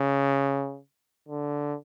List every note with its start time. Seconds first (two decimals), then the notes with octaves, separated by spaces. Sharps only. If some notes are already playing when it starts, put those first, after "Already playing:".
Already playing: C#3
1.28 D3